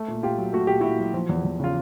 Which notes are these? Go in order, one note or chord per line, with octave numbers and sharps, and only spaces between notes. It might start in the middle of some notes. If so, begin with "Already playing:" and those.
Already playing: A3
A#2
A#2 F4 G4
F#3
A3 F#4
A#2 G4
A#2 E4 F#4
F#3
F3
E2
E2
C#3 F4